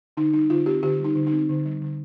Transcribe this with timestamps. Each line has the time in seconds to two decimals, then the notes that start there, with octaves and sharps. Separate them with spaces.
0.17 D3 D#4
0.34 G3 D#4
0.50 D3 F4
0.66 C4 G4
0.83 D3 G4
1.00 G3 D#4
1.16 D3
1.27 D#4
1.32 C4
1.49 D3
1.66 G3
1.81 D3